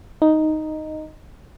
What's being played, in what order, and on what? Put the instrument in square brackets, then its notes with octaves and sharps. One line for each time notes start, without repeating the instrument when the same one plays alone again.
[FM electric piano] D#4